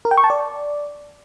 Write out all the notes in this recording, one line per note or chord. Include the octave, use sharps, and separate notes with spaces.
A#4
G5
C#6
A5
D5